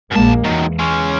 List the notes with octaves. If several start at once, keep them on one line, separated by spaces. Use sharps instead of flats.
A#1 F#2 G#3 A#3 A5
E2 D#3 F#3
G#3 C#4